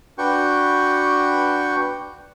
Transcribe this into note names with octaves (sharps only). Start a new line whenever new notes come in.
D4 F#4 B4 G5 C#6